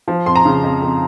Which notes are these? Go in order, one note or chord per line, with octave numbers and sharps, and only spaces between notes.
F3
F2 C6
A#5
C#3
F2
F2